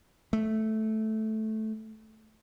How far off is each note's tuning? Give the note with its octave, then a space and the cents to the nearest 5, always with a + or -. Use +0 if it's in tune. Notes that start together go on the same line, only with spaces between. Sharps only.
A3 -10